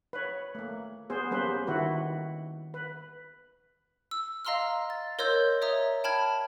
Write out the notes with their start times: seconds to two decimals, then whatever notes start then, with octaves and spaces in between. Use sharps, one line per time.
0.13 B4 C#5
0.55 A3 A#3
1.10 B3 G#4 C5
1.31 G3 A#3 C#4 B4 C5
1.67 D#3 E4 F#4 B4
2.74 B4
4.11 E6
4.45 D#5 F5 A#5 C6 E6 F6
4.90 A6
5.19 A#4 C#5 D#5 C6 E6 G6
5.62 C#5 D5 E5 A#5 D#6
6.04 G5 A5 B5 F6 G#6